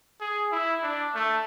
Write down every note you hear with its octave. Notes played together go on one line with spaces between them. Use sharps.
G#4
E4
D4
A3